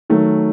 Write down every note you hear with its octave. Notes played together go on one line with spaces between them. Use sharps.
D#3 F#3 A3